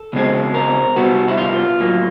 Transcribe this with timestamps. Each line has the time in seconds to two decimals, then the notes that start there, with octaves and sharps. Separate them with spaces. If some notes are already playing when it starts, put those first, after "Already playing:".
Already playing: A4
0.13 C#2 B2 G#3 C4
0.54 A#4
0.96 C2 B2 G3 B3 F#4
1.28 E4
1.38 F4
1.80 A2 F#3 A#3